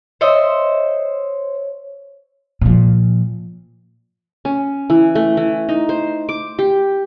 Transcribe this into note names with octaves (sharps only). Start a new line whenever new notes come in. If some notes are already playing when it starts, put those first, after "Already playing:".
C5 C#5 D#5 E5
A#2 F3
C#4
E3
A3
E3
D#4
C5
D6
G4